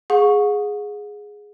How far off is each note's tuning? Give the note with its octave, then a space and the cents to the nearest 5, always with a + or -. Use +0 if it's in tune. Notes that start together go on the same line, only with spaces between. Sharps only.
G#4 +0 F#5 -40 C#6 +0